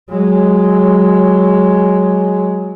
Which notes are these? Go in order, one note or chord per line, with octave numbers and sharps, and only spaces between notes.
F#3 G#3